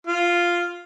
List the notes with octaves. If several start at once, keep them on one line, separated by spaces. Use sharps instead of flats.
F4